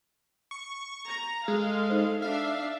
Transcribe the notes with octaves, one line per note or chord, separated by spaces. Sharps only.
C#6
A#5
G#3 A4 F5
D#4 C5
D4 E5 F5